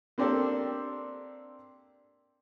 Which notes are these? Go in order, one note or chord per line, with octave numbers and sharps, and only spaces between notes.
A#3 C4 D4 G4 A4